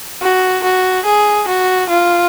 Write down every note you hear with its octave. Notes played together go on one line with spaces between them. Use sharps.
F#4
F#4
G#4
F#4
F4